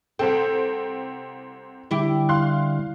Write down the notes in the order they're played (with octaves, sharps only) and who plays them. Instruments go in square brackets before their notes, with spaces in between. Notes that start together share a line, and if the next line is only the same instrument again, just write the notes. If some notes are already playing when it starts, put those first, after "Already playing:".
[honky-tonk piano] C2 C4 G5 [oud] A4
[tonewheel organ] D3 G3 [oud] E4 G4
[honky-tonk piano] F5 C6 F#6